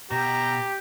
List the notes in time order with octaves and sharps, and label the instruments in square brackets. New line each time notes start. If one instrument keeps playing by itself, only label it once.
[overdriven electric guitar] B2 [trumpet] G4 [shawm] A#5